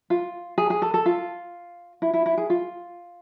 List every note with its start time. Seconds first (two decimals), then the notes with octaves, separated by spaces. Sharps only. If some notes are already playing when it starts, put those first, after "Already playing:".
0.10 F4
0.58 G#4
0.70 G#4
0.82 A4
0.94 A4
1.06 F4
2.02 E4
2.14 E4
2.26 E4
2.38 G#4
2.50 F4